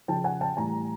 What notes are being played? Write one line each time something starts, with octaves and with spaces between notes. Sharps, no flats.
C#3 F3 G5 A5
F#5 G#5
G5 A5
A2 E3 G3 G#5 A#5